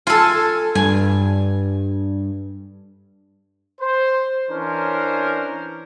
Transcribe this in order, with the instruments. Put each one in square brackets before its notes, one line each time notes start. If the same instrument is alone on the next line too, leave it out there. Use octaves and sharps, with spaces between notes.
[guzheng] F4 A4 [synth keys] G#5 A5
[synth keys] G2 [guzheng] G#5
[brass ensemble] C5
E3 C#4 D4 A#4 C5